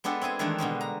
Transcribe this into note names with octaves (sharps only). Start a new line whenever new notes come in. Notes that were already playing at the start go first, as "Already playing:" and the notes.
G#3 B3 D4 G4 A4
C4 E4 G#4 G#5
D#3 E3 G#3 A3 D4
B2 D3 G3 G#3
A#5